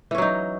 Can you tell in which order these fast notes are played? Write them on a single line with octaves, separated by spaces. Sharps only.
E3 C#4 F#3 D#4